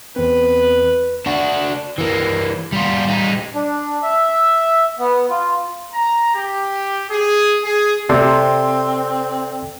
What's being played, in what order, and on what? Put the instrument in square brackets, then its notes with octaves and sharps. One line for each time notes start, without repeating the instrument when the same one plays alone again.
[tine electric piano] E2 C4 [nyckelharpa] B4
[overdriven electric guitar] D4 F#4
E3 A#3
G3 F4
G3 D#4
[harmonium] D4
E5
B3
F4
[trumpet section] A#5
G4
G#4
G#4
[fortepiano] C3 [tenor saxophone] C4 [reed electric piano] A4 D5 C6